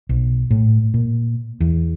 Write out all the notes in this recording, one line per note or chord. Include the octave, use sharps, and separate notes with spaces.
B1
A2
A#2
E2